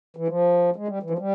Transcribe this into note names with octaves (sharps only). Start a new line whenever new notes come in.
E3
F3
G#3
G3
E3
F3
G3